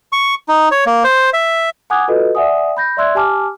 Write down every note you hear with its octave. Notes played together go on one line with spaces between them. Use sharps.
C#6
D#4
C#5
A#3
C5
E5
F#5 G#5 D6 D#6 F#6 G#6
F4 F#4 A4 B4 D#5
D5 E5 F#5 G#5 D#6
B5 G6 A#6
D5 E5 C6 E6 F#6 G#6
G4 G#5 A5 D6 F6